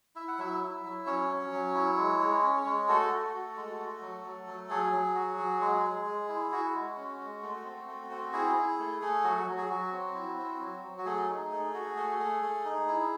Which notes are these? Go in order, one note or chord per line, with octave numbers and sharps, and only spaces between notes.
E4 E5
F#5
F#3 E4 E5
E4
F#3
C#4 C#5
C#4
F#3
E4
G#3
G#3
C#4
G#3
A3 F#4 A4
F#4
F#4
G#3
F#4
F#3
F#3
F#3
F#3 G#4
F#3
F#4
F#3
G#3
G#3
G#3
E4
E4 F#4
G#3
C#4
G#3
A3
C4
A3
C4
E4 G#4
E4
A3
A3
F#3 F#4
F#3
G#4
F#3 F#4
C4
E4
C4
F#3
F#3
F#4
A3 G#4
D#4
A3
F#4
A3
A3
A3
D#4
E4